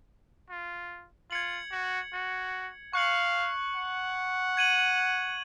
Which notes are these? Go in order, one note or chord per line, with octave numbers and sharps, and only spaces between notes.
F4
F4 G#6 C#7 F#7
F#4
F#4
F5 C#6 F#6 C#7 F#7
F#5
G#6 D#7 F#7